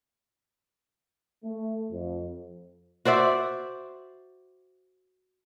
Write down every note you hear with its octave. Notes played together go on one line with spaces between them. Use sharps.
A3
F2
F#4 C5 D5 E5